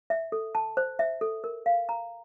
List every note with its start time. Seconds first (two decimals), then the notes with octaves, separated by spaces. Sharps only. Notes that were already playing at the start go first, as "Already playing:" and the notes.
0.10 E5
0.32 A4
0.55 A5
0.77 C5
0.99 E5
1.21 A4
1.44 A#4
1.66 F5
1.89 A#5